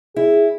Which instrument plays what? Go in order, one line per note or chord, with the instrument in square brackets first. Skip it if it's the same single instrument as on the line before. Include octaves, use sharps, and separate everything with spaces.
[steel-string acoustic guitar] E4 [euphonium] G#4